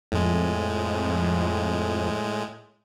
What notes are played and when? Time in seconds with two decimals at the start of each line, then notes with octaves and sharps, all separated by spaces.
0.12 F2 A2 G#3